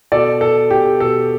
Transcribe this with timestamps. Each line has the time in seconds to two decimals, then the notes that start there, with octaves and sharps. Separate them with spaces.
0.12 B2 A4 D5
0.41 B2 A4
0.71 B2 G4
1.00 B2 A4